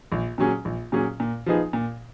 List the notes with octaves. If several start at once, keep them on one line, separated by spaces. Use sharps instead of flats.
A#1
A#2 F#3 C#4 G#4
A#1
A#2 F#3 C#4 G#4
A#2
F3 B3 D#4 G#4
A#2